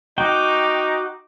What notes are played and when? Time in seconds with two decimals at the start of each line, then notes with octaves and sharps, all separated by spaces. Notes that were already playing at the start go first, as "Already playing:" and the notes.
0.18 D#4 F#4 G5 D6